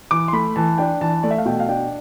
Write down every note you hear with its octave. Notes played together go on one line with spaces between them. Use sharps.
E3 D6
C6
A3 B5
E3 A5
D4 G5
E3 A5
A3 D5
E5
F5
B2 G5
F5
D4 G5